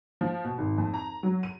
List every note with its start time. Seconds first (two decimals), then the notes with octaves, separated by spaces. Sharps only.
0.21 F3
0.45 B2
0.58 G#1
0.78 F2
0.94 A#5
1.23 F#3
1.43 D#7